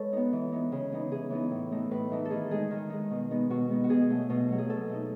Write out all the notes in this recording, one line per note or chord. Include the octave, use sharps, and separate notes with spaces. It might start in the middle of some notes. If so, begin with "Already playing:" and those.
Already playing: G#3 A4 B4 C#5
B3 D#4
E3
B3 D#4
C#3
E3 B3 D#4
C#3 G#4
E3 B3 D#4
A2
E3 A3 D#4
A2 B4
E3 A3 D#4
A4
D#3 G#4
G#3 D#4 G#4
D#3
G#3 D#4
B2
G#3 B3 D#4
B2 F#4
G#3 B3 D#4
F#4
B2 G#4
F#3 A3
B2
F#3 A3
G#4
B2 A4
A3 D#4